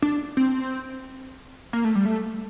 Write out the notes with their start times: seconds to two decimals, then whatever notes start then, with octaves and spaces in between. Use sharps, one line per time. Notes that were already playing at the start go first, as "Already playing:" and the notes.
0.02 D4
0.37 C4
1.73 A#3
1.85 A3
1.95 G3
2.06 A3